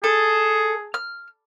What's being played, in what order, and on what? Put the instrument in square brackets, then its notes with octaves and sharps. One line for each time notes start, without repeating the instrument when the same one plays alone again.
[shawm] G#4 [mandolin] A4
[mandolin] F6